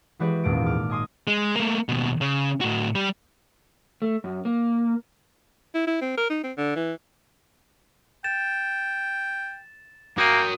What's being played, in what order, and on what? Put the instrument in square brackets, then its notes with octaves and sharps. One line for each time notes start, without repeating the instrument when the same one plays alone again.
[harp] E3 G#3 F#4 G4 B4 D5
D#1 G#1 E2 A#2 D7
D6 F6
D#5 G#5 C6 D#6
[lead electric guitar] G#3
A3 A#3
D#2 B2
C#3
A2 F#4
G3
[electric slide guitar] A3
F#2
A#3
[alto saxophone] E4
E4
C4
A#4
D#4
C4
D3
E3
[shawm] G5 [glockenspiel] A6 E7
[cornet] A#3 [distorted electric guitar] F#4 A#4 [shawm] G5 [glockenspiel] D#6 D#7